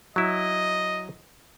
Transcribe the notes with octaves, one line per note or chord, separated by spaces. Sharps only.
F#3 E4 D#5